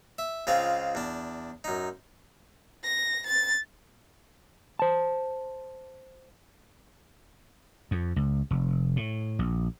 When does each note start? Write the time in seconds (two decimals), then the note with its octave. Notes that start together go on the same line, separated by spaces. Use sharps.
0.18 E5
0.47 C#2 G#3 C4 F4 F5
0.95 E2 D4
1.64 F#2 D#4
2.83 A#6
3.27 A6
4.79 C5 A5
7.91 F2
8.16 C#2
8.51 F1
8.96 A2
9.39 A#1